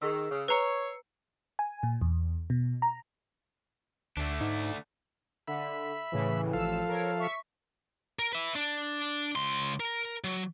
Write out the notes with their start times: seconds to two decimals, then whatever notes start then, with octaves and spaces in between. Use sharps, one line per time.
0.02 D#3 G#4 E6
0.30 C#3
0.48 B4 C#5 A#5 E6 C7 C#7
1.59 G#5
1.83 A#2
2.02 E2
2.50 B2
2.82 A#5
4.17 D2 D3 A3 D4
4.41 G#2 D#4
5.48 D3 E5 B5
6.12 A2 C#3 E3
6.53 A1 F3 A4 F5 E6
6.88 A#4 C#5
7.18 E5 C#6 B6
8.19 A#4
8.33 B4 E5
8.55 D4
9.36 C#2 C6
9.80 A#4
10.24 F#3